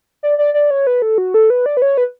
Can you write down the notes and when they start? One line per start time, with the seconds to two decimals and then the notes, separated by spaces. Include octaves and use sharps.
0.23 D5
0.38 D5
0.54 D5
0.71 C#5
0.87 B4
1.02 A4
1.18 F#4
1.34 A4
1.50 B4
1.66 D5
1.77 B4
1.82 C#5
1.97 B4